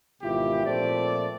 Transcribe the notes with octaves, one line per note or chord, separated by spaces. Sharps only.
G#1 B2 E3 E4 F4 G4
A#2 F3 A3 C4 C5 D5